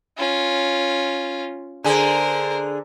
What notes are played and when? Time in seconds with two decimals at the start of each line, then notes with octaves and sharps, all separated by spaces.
0.18 C#4 F4
1.84 D3 G#4 A#4 C5